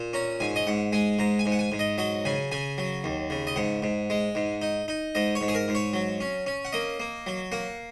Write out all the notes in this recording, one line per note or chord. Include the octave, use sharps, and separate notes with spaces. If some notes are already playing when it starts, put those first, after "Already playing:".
Already playing: A#2
C#4 A#5
G#2 G#5
D#5
G#2 F#5
G#3 G#5
G#2 A#5
G#5
G#2
F#5
G#5
G#2
D#5
F#3 D#5
C#3 G#5
C#3 G#5
F#3
D#2
C#3
D#5
G#2 F#5
G#2
G#3
G#2
D#4
D#4
G#2 D#5
C#5
G#2
G#4
A#4
G#2
C#5
F#3
C#4
C#4
F#5
A#3 D#5
A#3
F#3
A#3 F#5